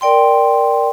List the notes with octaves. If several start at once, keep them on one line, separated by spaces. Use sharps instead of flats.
A#4 D5 G5 C6